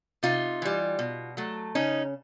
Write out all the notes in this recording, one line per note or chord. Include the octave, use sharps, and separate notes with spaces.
C3 D#4 F4
E3 G3
B2
F#3 A3
C#3 C#4 D#4